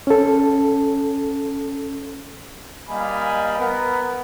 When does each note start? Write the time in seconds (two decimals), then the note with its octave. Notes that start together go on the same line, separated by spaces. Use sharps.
0.07 C#4 A4
2.89 G3 A#3 D#5 F5 G#5 B5
3.58 B3 A#4